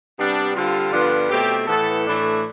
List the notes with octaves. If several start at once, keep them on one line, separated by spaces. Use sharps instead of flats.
C3 G3 B3 D4
D3 G3 C4 F4
G2 D3 F3 B3 D4
B2 A3 C4 G4
A2 E3 B3 A4
A2 E3 A3 D4